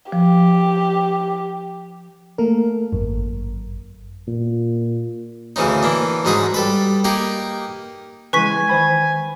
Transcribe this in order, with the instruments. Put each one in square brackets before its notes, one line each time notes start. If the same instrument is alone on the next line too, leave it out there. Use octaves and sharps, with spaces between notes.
[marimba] F3 [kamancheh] G4
[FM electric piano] A3 A#3 A4 A#4
G#1 F#2
[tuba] A#2
[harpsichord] D2 C#3 E3 C#4 D#4
E3 A#3 D4
G#2 F#3 C#4 D#4 G#4 B5
G3 A4 B4
A#3 D#4 G4 A#4
[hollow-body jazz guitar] C#3 E3 G#3 [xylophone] B4 C#6 B6 [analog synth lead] G#5
[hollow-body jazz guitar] D#3 C5 B5